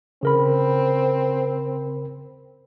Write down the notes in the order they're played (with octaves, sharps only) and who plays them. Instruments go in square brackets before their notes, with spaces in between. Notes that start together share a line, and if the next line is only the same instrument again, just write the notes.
[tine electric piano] C#3 A#4 B5 [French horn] C4